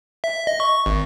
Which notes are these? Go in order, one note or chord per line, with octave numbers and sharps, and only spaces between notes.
E5
D#5
C#6
G#1